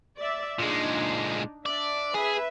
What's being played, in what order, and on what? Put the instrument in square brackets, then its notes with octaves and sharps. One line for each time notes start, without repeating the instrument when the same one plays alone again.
[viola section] D5 E5
[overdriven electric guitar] A#2 G#3 [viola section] D4 D#4
[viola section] D4 E5 [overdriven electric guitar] D5
[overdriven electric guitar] G#4 [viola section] B4 E5